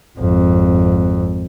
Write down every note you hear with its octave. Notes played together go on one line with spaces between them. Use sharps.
G#1 F2